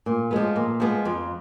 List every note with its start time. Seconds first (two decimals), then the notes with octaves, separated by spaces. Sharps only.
0.06 A#2
0.31 F3 G#3 B3
0.56 A#2
0.80 F3 G#3 B3
1.05 F2